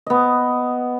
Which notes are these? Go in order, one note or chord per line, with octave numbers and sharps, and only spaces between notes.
B3 D#5